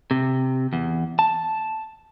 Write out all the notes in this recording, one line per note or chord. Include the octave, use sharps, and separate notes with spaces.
C3
E2
A5